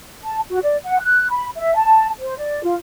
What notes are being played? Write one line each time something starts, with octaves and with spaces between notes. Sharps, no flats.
A5
F#4
D5
F#5
F#6
B5
E5
A5
C5
D5
F4